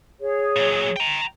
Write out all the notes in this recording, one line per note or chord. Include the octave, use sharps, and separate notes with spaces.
G#4 C#5
A#2 F#3
G5 A#5